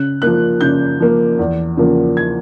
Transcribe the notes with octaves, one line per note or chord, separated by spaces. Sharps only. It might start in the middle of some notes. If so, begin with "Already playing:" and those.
Already playing: C#3 F#6
F3 A#3 F#6
C#3 G6
F3 A#3
E2
C#3 F3 A#3
G#6